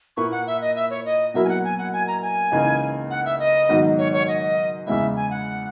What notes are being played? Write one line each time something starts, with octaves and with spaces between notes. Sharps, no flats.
A#2 A#3 E4 B4 C#6
F#5
E5
D#5
E5
C#5
D#5
B2 F#3 A#3 E4 A#4 E5
G#5
F#5
G#5
F#5
G#5
A#5
G#5
C#2 C#3 E3 A#3 D#4
F#5
E5
D#5
G#2 D#3 F#3 B3 D#4
C#5
C#5
D#5
E2 C#3 G#3 B3 E4 E5
G#5
F#5